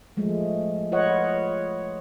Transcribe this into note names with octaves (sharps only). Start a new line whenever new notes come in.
F3 G#3 A3
F4 B4 C#5 D#5 F#5